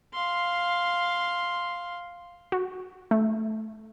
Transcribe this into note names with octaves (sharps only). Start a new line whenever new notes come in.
F5 C6
F#4
A3